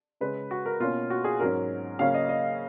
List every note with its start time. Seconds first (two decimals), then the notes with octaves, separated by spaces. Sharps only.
0.21 C#3 G#3 C#4 B4
0.51 F#4
0.66 A#4
0.80 B2 A#3 C#4 F4
1.10 F#4
1.24 G#4
1.40 G#2 F#3 C#4 A#4
1.99 C#3 F#3 A#3 C#4 F5
2.14 D#5
2.29 D#5